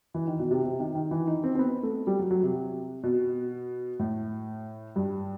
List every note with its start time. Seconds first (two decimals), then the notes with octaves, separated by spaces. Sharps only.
0.14 E3
0.27 D#3
0.39 B2
0.51 C3
0.63 C3
0.79 D#3
0.95 D#3
1.11 E3
1.27 D#4
1.44 C4
1.55 C4
1.59 B3
1.83 A3
2.07 G3
2.19 F#3
2.31 F#3
2.43 C3
3.03 B2
3.99 A2
4.96 G2